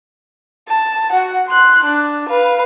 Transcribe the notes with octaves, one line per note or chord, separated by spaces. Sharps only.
A5
F#4 F#5
C6 F#6
D4
B4 F5